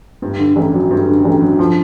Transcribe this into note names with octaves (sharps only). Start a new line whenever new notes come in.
G2
D3
A1
F#3
G2
D3
A1
F#3
F3